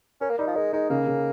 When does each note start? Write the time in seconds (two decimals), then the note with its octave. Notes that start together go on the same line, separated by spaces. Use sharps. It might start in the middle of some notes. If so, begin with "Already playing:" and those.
0.21 C#4 A#4
0.30 A#3
0.38 G3 D#4
0.47 F3
0.56 G#3 A#4
0.73 G#3 D#4
0.90 C#3 A#3
1.07 C#3